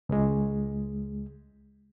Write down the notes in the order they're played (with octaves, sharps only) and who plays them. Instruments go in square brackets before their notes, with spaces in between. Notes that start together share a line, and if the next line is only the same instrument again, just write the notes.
[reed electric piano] C#2 G#3